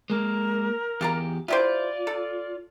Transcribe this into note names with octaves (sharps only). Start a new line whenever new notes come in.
G#3 A#3 A#4
E2 F4 G4 F5 A#5
E4 F4 G4 C5 D5
A4